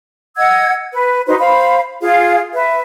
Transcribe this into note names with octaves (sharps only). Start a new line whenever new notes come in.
D#5 F#5 E6 G#6
B4
D#4 F#4 B4 C5
C5 F5 B5
F4 G#4 F5
B4 E5